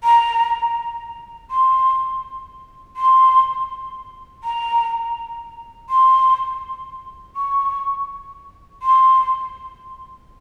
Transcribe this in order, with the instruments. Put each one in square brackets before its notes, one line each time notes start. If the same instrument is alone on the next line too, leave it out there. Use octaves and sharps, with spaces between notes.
[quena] A#5
C6
C6
A#5
C6
C#6
C6